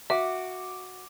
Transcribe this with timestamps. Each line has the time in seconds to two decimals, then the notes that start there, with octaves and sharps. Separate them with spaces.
0.10 F#4 E5 D6